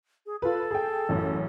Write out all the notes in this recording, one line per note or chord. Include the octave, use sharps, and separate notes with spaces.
G#4
F4 A4 B4
G#4 G5
A1 F#2